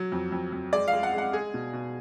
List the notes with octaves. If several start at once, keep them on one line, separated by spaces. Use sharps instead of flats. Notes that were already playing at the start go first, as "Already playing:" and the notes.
Already playing: F#3
F2
F2
F2
G#3 D5
F5
G#3
F#5
G#3 F#5
G#3 G#4
B2
B2